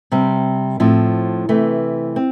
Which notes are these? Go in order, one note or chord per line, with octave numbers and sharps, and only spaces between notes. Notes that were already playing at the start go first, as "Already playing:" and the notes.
C3 G3 C4
A2 F3 C4
C3 E3 A3
C4